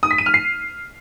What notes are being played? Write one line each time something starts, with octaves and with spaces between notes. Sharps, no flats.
D#6
B6
D#7
F6
C7